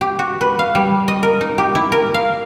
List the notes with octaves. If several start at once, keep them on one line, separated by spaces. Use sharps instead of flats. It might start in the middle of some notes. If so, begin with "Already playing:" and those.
G4
F#4
B4
F5
G3
D#5
A#4
D#4
G4
E4
A#4
F5